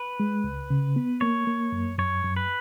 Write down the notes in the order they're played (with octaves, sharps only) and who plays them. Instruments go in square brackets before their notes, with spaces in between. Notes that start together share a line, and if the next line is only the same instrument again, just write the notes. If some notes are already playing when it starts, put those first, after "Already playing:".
Already playing: [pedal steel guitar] B4
[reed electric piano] G#3
C#2
C#3
B3
[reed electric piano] A#3 [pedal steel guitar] C#5
[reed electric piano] A#3
F#2
[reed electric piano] F#2 [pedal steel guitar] C#5
[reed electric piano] F#2
[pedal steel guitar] B4